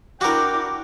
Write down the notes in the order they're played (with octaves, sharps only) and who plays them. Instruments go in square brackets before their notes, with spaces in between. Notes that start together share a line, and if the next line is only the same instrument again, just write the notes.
[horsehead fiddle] D4 E4 [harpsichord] F#4 A#4 [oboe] G5 [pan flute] D6